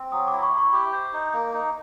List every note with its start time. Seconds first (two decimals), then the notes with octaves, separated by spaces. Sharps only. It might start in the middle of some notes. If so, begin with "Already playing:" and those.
Already playing: C4
0.12 F#3 D#6
0.28 E4 D6
0.43 C#6
0.53 E4
0.58 C#6
0.73 G4 D6
0.93 C5
1.13 D#4
1.33 A#3
1.54 D#4